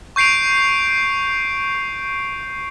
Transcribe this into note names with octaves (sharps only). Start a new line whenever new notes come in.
C#6 G6 C7 D7 F7